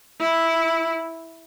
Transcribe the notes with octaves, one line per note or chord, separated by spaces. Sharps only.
E4